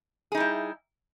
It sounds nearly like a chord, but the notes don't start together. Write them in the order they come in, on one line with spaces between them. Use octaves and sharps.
G#4 D#4 G3 E4